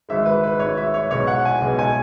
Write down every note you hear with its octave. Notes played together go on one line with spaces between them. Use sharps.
G#1 G#2 G#3 E5
B4
B4
G#1 G#2 G#3 C#5
E5
C#5
B1 B2 G#3 B3 C#5
F#5
G#5
B1 B2 G#3 B3
G#5